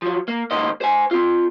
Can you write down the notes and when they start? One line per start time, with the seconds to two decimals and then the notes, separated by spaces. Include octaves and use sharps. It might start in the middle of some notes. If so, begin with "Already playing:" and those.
0.02 F3 F#3
0.28 A#3
0.51 C#2 G#2 D#3 A#3 C5 D#5
0.81 C5 G#5
1.11 C4 F4